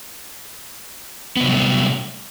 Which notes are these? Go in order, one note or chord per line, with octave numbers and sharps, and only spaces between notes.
C3 F#3 G3 A3 B3